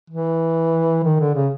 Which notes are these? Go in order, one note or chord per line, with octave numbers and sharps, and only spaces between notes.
E3
D#3
D3
C#3